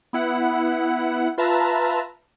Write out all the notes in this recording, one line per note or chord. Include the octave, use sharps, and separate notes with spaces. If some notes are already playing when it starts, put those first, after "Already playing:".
B3 E4 F#5
F4 B4 E5 A5 A#5